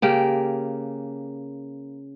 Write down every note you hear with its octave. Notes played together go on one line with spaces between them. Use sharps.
C#3 A#3 G4